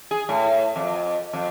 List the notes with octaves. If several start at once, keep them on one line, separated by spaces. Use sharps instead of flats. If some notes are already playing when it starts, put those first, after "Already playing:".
G#4
A2
F2
F2